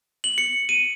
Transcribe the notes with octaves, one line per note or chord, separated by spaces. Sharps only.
F#7
C#7
D#7